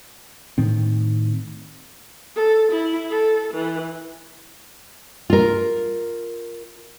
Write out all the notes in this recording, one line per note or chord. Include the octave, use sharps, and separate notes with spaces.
A2 D#3 C4
A4
E4
A4
E3
F4 A#4